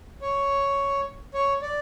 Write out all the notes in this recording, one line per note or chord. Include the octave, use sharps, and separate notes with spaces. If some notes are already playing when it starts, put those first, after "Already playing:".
C#5
C#5
D5